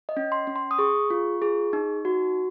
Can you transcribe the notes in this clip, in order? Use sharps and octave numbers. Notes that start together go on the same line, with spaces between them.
D#5
C#4
C6
C#4
C6
D#6
G#4 C#6
F4
G#4
D#4
F#4